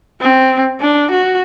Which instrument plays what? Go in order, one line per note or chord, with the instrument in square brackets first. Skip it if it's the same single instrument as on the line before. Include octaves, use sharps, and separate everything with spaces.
[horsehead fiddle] C4
D4
F#4